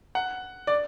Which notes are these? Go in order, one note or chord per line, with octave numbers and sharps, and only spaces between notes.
F#5
D5